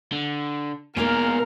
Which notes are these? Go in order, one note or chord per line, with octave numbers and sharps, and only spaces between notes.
D3
B2 G#3 A#3 D#4 A#4 F5